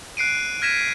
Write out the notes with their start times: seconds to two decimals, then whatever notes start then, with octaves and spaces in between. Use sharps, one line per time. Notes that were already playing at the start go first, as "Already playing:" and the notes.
0.17 F#6 C7 D7 D#7
0.62 F6 G#6 A#6 B6 D#7 E7